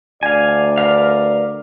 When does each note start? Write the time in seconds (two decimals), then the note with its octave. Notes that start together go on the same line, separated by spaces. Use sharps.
0.23 D2 D5 F5 G#5
0.78 A#4 B4 F5